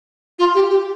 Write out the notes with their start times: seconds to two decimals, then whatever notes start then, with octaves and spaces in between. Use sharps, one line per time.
0.39 F4
0.55 G4
0.70 G4